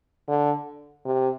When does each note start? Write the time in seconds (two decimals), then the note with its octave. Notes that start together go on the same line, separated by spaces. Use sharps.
0.28 D3
1.05 C3